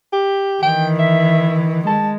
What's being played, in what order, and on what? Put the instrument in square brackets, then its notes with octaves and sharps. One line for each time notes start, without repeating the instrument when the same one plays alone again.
[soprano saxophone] G4
[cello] D#3 E3 [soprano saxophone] G5
[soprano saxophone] E5
[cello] G#3 [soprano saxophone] A5